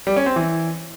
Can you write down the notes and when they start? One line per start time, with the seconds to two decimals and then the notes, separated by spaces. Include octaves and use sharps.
0.07 G3
0.16 C#4
0.26 C4
0.36 E3